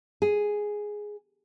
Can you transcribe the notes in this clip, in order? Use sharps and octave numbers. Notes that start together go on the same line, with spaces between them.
G#4